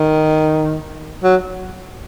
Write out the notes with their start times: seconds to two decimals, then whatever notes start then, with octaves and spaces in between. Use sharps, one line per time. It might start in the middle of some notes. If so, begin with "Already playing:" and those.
Already playing: D#3
1.23 F#3